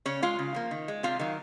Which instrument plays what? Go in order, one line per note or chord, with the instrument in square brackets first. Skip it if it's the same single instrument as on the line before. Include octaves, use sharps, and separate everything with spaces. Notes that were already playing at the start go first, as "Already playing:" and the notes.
[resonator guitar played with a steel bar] C#3 C#4 C#5
G#3 F4 F5
C#3
F3 A#3
D#3
G#3
C3 F4 F5
D#3 F#3